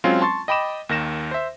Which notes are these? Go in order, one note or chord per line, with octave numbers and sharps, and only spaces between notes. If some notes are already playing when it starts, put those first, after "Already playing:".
F#3 G#3 C4 C#4 F4
A5 C6 C#6 A6
D#5 G5 B5 D6 E7
D#2 D#3 A#6 E7
C5 E5